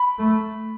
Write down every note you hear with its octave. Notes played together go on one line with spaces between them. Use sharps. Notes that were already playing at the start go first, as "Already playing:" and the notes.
Already playing: B5
A3